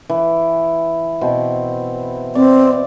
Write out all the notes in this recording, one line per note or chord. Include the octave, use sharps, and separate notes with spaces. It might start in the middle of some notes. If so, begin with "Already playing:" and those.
E3
B2 C4
C4 D5